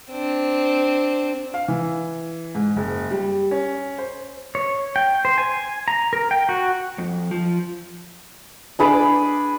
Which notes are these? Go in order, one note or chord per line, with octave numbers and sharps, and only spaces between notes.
C4 D4
F5
E3
G#2
F#1
G3
C#4
C5
C#5
G5
C5
G#5
A#5
A#4
G5
F#4
F2
F3
D4 G#4 B5 D6